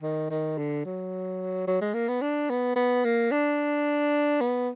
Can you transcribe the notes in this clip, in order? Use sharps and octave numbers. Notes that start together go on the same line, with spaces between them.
D#3
D#3
D3
F#3
F#3
G#3
A#3
B3
D4
B3
B3
A#3
D4
B3